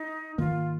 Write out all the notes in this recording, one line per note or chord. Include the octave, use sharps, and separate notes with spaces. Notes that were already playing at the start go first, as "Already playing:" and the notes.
Already playing: D#4
G#2 D#3 A#3 F4